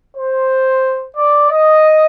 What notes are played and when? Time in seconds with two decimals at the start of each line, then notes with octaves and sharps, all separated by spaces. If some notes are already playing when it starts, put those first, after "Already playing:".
0.16 C5
1.16 D5
1.51 D#5